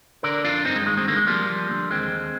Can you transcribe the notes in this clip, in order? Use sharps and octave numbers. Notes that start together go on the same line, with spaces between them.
D3 A#4 D5
F2 D4 F4
G2 C4 D#4
G#3
D#3 G#3
G#3 C4
D3 A#3
G#3
F3 G3 A#3
F3
D3
D#2 G#3 C4
D#2